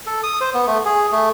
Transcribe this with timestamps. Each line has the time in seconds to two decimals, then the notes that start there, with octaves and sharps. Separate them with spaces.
0.06 A4
0.23 D#6
0.41 C5
0.54 B3
0.67 A3
0.85 G#4
1.12 A3